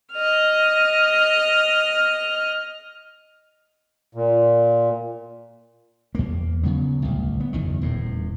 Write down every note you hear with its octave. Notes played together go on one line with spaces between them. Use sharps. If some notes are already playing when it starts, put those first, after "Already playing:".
D#5 F6
A#2
E2 A#3
C#3 F#3 B3
D1 C2
B3
F#1 E2 D#3
D#1 E2 A2